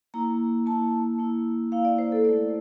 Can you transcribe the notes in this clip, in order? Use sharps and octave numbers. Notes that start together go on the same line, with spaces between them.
A#3 E4 A#5
A#3 E4 A5
A#3 E4
A#3 E4 F5
D5
C5
A4
A3 E4 D5